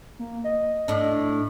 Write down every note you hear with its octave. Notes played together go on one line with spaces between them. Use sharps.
A#3
D#5
A2 D4